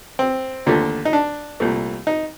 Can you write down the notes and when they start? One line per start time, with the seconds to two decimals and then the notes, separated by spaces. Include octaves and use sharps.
0.19 C4
0.66 D#2 D3 F3 A3
1.05 D#4
1.13 D4
1.60 C2 A#2 A3
2.07 D#4